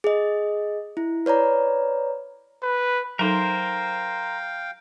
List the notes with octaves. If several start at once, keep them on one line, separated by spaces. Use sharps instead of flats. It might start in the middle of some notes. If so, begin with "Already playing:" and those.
G#4 D#5
E4
B4 C#5 D5 A#5
B4
F#3 D#4 A4 A#4 C5 F5 G5